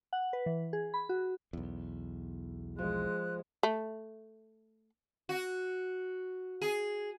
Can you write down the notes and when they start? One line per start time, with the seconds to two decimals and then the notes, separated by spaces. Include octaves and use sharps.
0.13 F#5
0.33 B4
0.46 E3
0.73 G#4
0.94 B5
1.09 F#4
1.53 B1 E2
2.79 F3 G#3 F#6
3.63 A3
5.29 F#4
6.62 G#4